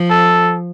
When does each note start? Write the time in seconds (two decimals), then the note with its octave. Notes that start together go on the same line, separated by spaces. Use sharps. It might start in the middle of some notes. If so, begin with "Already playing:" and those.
Already playing: F3
0.10 A4